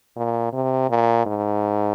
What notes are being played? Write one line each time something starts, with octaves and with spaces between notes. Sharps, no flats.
A#2
C3
A#2
G#2